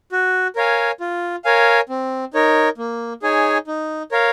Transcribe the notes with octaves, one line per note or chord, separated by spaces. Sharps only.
F#4
A#4 C#5 F5 G#5
F4
A#4 C#5 F5 G#5
C4
D#4 A#4 C#5
A#3
D#4 G#4 C#5 G#5
D#4
A#4 C#5 F5